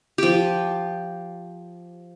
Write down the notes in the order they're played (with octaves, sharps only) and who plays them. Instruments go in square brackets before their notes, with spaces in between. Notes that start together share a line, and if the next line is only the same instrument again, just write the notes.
[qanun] F3 G4